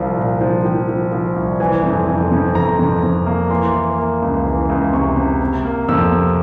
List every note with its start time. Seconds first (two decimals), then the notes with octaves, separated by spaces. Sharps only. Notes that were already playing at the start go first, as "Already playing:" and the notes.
Already playing: C2 F3 F5
0.17 A#2
0.41 F3
0.65 F3 G5
0.89 F3
1.12 F3
1.36 C2
1.60 E3 G#5
1.83 F2
2.08 F2
2.31 F2
2.55 F2 A#5
2.79 F2
3.03 F2
3.26 A#3
3.50 E3 C6
3.75 E3
3.98 A#3
4.22 C#2
4.46 E3
4.69 C#2
4.93 C3 C#6
5.17 C3
5.41 C3
5.65 A#3
5.88 F2 E6
6.12 C3